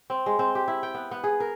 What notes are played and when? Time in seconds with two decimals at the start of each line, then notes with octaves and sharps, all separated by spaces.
0.10 C4
0.26 G#3
0.39 C4
0.55 G4
0.68 E4
0.83 G5
0.94 B3
1.11 B3
1.24 G#4
1.40 A#4